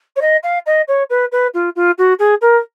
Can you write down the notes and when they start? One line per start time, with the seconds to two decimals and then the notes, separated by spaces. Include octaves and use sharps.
0.16 C#5
0.21 D#5
0.43 F5
0.66 D#5
0.88 C#5
1.10 B4
1.32 B4
1.54 F4
1.75 F4
1.98 F#4
2.19 G#4
2.41 A#4